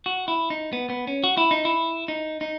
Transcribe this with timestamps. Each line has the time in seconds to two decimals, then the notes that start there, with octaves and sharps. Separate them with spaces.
0.06 F#4
0.28 E4
0.50 D#4
0.73 B3
0.90 B3
1.07 C#4
1.24 F#4
1.37 E4
1.51 D#4
1.65 E4
2.08 D#4
2.41 D#4